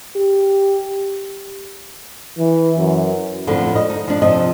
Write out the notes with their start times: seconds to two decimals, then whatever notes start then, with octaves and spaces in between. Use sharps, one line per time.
0.16 G4
2.38 E3
2.78 F#2
3.47 F2 A2 D3 F3
3.76 D#5
3.90 D#4
4.08 F3 D4
4.22 C3 F3 D#5